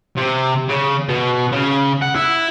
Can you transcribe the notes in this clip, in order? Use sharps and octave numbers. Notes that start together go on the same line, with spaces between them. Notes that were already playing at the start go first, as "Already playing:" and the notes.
C3
C#3
B2
C#3
F#5
E4